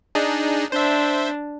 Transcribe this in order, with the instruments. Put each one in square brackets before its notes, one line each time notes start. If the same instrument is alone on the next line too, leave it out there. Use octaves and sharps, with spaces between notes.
[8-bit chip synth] D4 D#4 G#4
[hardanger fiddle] D4 [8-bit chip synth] C5 E5